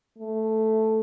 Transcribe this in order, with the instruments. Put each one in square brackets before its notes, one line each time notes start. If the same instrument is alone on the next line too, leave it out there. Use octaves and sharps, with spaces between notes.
[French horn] A3